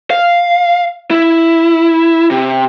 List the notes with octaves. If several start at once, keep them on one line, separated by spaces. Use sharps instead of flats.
F5
E4
C3